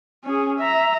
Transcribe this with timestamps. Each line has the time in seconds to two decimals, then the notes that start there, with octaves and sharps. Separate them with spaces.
0.24 C#4 G#4
0.59 E5 A#5